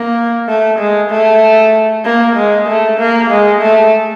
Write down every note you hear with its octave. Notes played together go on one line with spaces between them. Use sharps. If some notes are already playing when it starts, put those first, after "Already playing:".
Already playing: A#3
A3
G#3
A3
A#3
G#3
A3
A#3
G#3
A3